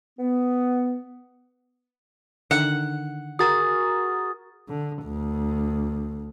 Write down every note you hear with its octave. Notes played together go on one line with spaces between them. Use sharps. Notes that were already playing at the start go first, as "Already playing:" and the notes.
B3
D3 D#3 F#5
F#4 G#4 A#4 D#6 A6
D3
D2